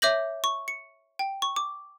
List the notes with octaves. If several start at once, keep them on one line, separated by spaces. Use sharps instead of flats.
C#5 E5 D6 G6 A#6 F#7
C#6
C#7
G5
C#6
D6